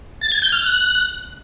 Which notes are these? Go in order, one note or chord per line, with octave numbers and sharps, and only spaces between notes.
A6
G#6
G6
F6
F#6